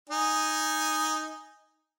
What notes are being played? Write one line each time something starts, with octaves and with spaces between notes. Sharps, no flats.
D#4 G#5